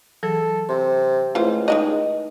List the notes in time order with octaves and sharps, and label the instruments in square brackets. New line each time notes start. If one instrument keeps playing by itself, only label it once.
[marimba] E3 F#3 G#4 [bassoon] A4
[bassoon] C3 [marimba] C6
[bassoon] C#2 [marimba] A3 E4 [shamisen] F4 C5
[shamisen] D#3 G#3 D#5 [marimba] D#4